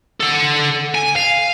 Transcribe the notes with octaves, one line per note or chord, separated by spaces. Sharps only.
A4 F#5
G#5
F5